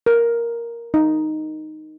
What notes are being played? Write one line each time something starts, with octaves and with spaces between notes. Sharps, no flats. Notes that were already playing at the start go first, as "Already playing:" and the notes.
A#4
D#4